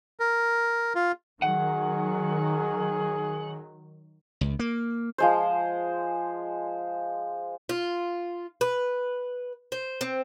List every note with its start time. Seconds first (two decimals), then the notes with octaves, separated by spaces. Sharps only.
0.20 A#4
0.95 F4
1.42 D#3 F#3 G#4 F#5
4.41 C#2
4.59 A#3
5.18 F3 G#3 C5
7.69 F4
8.61 B4
9.72 C5
10.01 C4